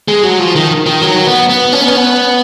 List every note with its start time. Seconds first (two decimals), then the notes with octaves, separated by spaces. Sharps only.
0.08 G#3
0.23 F#3
0.39 F3
0.56 D#3
0.86 D#3
1.01 F#3
1.26 B3
1.49 B3
1.72 C#4
1.81 B3
1.88 C#4
1.97 B3